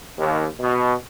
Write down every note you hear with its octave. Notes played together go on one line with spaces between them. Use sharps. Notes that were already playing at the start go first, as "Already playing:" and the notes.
D#2
B2